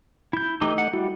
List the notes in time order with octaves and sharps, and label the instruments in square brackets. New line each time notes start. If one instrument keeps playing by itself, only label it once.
[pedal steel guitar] E4 G6
[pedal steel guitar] E3 D#4 G4 [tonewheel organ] A3 D#5
[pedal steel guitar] F#5
[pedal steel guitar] G3 [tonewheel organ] E4 F#4